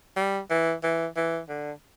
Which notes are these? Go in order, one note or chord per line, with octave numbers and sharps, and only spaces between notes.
G3
E3
E3
E3
D3